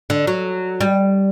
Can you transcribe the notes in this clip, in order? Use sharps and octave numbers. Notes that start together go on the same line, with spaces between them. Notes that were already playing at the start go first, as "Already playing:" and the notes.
D3
F#3
G3